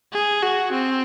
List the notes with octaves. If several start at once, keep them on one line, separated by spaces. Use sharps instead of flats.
G#4
F#4
C4